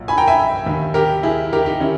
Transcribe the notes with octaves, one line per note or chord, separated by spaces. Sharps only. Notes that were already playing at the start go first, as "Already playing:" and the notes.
Already playing: B1 A#2
G#5 B5
G5 A#5
E5 G#5
D#2 D#3
G4 A#4
E4 G#4
G4 A#4
D#4 G4
D#3 C#4 E4